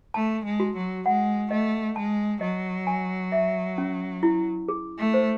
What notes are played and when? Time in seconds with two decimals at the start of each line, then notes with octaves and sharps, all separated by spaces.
0.14 A3 A5
0.45 G#3
0.60 F#4
0.75 F#3
1.06 G#3 F#5
1.51 A3 D#5
1.96 G#3 A5
2.41 F#3 D#5
2.87 G#5
3.32 E5
3.78 C#4
4.23 E4
4.68 G#4
4.98 A3
5.14 C5